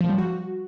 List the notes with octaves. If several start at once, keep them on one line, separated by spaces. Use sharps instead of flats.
F3
G3
F#4